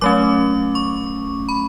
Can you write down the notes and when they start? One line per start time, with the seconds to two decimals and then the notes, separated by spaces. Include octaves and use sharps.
0.01 F#3 A3 C#4 D6
0.75 C#6
1.49 B5